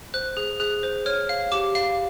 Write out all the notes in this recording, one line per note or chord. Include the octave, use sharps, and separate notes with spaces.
C5 F#6
G#4
G#4 F#6
C5
C#5 F6
F5
G4 D6
F5